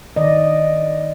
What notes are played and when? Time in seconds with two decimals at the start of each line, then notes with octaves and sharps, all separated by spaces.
0.16 D#3 D5 D#5